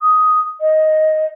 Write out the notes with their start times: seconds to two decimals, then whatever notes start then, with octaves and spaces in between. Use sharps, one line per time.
0.02 D#6
0.61 D#5